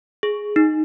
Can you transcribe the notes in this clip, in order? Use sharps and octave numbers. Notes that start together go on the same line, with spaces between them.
G#4
D#4